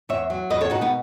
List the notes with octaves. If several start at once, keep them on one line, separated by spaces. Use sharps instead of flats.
E2 C#5 E5
F#3
E2 B4 D#5
A4 C#5
B2 D#4 F#4
B3 D#4